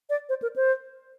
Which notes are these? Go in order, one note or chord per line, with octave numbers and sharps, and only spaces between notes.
D5
C5
A#4
C5